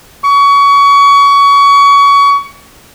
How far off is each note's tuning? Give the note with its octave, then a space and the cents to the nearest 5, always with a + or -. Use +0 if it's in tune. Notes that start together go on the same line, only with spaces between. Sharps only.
C#6 +30